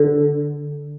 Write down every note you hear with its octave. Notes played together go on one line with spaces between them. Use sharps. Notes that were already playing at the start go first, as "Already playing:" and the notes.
Already playing: D3